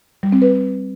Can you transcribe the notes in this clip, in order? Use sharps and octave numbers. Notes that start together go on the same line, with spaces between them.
G3
C4
B4